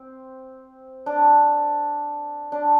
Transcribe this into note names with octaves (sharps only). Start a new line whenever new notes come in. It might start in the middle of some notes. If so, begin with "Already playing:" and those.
Already playing: C4
D4
D4